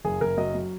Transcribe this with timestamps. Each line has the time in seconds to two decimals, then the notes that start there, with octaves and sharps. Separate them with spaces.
0.05 F#1 G#4
0.21 F#1 A#4
0.37 F#3 D#5
0.55 F#3